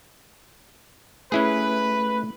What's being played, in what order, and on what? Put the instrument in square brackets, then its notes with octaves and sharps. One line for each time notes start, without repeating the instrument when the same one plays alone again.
[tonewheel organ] A3 [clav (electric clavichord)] C#4 E4 G#4 [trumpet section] B4